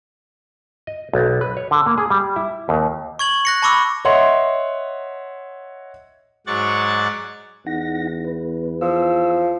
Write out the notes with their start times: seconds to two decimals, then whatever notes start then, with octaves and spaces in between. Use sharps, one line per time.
0.87 D#5
1.13 B1
1.41 B4
1.57 C#5
1.71 D3
1.86 A#3
1.98 G#4
2.10 G3
2.36 E4
2.69 D#2
3.19 C#6 G#6 F#7
3.45 F#6 A#6 C#7
3.62 A5 B5 C#6 D6 E6
4.05 C#5 D#5 E5 F#5 C6
6.47 G#2 F#3 D5 F#5 C#6 A6
7.66 E2 D#4 F#5 A#6
8.24 B4
8.81 F3 E6